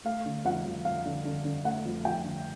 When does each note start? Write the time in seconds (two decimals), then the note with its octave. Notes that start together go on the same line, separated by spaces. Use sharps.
0.04 A3 F5
0.26 D3
0.45 F2 F#5
0.65 F2
0.85 F2 F5
1.06 D3
1.25 D3
1.45 D3
1.64 A3 F#5
1.86 F2
2.05 F2 G5
2.25 D3